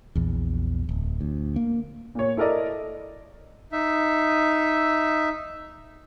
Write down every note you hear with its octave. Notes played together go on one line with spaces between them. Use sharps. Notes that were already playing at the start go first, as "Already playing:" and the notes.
A#1 E2
D1
D2
A#3
A#2 C#5
E4 A4 A#4 D5 D#5
D#4 E5